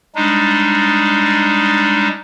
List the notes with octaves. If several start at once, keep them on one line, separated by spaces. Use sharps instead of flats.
G3 G#3 D4 D#4